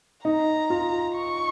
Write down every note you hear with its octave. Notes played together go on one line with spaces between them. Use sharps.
D#4 A#5
F4
C#6